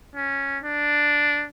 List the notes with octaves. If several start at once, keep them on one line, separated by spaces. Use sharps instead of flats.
C#4
D4